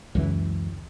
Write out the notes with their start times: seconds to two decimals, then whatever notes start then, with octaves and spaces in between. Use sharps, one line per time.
0.15 C#2 F#2 E3